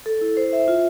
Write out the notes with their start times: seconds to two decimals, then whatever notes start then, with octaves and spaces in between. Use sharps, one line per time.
0.06 A4
0.21 E4
0.37 C5
0.53 E5
0.68 F4